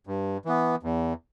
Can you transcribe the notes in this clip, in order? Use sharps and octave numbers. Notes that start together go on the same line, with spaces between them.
G2
E3 B3
E2